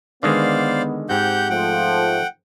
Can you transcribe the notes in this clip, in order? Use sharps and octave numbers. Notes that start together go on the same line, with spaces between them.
D3 D#3 G#3 B3 C5 D5 F5
G#2 C4 G4 F#5 G6
F3 A3 F#5 G5